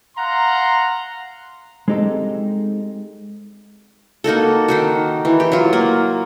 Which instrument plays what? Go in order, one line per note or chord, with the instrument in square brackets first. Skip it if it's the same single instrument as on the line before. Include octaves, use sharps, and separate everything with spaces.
[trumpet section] F5 F#5 A#5 C6
[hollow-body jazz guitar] G#3 C4 D#4 G4 A4
[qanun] A#3 D#4 F#4 A4
D#3 D#4 F#4
E3
G4
F#3 F4
A#3